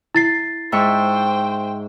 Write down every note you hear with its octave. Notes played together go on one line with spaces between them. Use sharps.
E4 A6 C7
G#2 C5 E5 G5 C#6